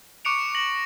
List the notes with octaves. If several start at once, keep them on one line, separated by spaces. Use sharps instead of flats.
C#6 D6 F#6 C#7 D7 F7
A#6 F#7